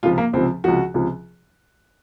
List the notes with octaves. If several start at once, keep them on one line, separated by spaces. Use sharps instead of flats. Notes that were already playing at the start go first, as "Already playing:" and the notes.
C#2 C3 F3 F4
A#3
C#2 C3 F3 C4
C#2 C3 F3 F#4
C#2 C3 F3